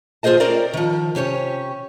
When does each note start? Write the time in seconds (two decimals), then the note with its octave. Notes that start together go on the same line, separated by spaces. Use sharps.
0.23 D#2 F4 G#4 C5 D#5 A5
0.40 C4 C#4 A#4 D5
0.74 D#3 F3
1.15 C3 C#4 G4 C#5